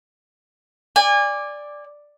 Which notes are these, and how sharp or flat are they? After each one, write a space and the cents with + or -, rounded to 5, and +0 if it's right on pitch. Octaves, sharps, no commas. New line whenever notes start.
D5 +0 G#5 -30